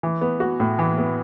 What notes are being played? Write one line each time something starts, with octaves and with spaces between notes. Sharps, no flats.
E3
B3
F#4
A2
E3
B3